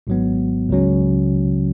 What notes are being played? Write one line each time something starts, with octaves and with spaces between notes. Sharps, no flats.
G#1 G#2 F#3 B3
C#2 C#3 F#3 C#4